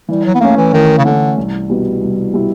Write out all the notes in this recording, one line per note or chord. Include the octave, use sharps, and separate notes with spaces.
E3 G3
F#3
B3
A3 A#3 C#4
E3
D#3 E3
C#3
D3 A3 C#4
C2
B2 G3 B3 E4
C2
B2 G3 B3 E4